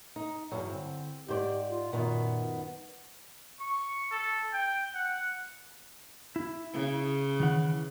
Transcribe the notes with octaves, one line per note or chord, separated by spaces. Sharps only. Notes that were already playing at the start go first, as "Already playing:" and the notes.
D#4
E2 G2 F#3
D3 C4
G#2 G4 C5 D5
F4
F#2 A#2 D#3 B3
C#6
A4
G5
F#5
E4
C#3
D#3 E3 F#5